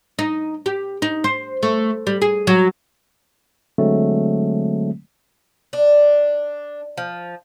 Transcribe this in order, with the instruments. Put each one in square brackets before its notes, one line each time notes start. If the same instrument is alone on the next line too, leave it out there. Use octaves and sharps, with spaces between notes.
[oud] D#4
G4
D#4
C5
A3
G3
G#4
F#3
[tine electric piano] D3 F#3 G#3 A3 C4
[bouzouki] D4
F3